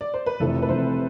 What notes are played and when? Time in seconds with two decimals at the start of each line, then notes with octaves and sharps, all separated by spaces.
0.01 D5
0.14 C5
0.26 B4
0.40 F1 F2 C3 E3 A4
0.62 B4
0.68 F1 F2 C3 E3 C5